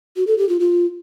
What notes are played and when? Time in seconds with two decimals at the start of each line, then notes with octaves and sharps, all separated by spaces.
0.16 F#4
0.27 A4
0.38 G4
0.49 F4
0.60 F4